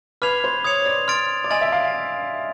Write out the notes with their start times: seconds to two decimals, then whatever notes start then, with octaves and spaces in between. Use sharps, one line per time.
0.22 B4 D6 F6 G#6 C7 F7
0.44 C5
0.64 C#5 D#6 G#6 C#7 F7
0.80 C#5
0.86 D5
1.08 C6 F6 A6 D7
1.44 D5
1.50 D#5 G#5 C6 F6 A6
1.61 E5
1.72 F5